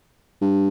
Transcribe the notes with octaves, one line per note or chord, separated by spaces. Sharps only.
G2